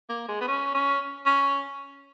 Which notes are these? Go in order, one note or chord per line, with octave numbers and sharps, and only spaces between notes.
A#3
G#3
B3
C#4
C#4
C#4